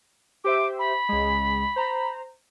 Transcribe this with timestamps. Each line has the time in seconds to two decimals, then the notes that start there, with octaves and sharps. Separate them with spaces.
0.44 G4 C5 E5 D6
0.79 B5
1.09 C#2 G#3
1.76 C5 A#5